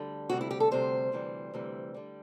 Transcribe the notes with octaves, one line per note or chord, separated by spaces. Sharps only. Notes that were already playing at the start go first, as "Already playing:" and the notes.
Already playing: D2 D3 G3
D2 C3 G3 F#4
E4
G4
A4
D2 C3 G3 C5
D2 C3 E3 G3
D2 C3 E3 G3
D3 G3